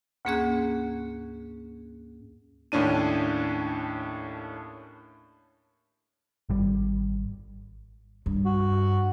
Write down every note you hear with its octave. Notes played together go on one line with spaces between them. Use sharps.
D2 G#2 A#3 C#4 G#4 F#6
D#2 A2 C#4 D4 D#7
G#1 G3
G2
F#4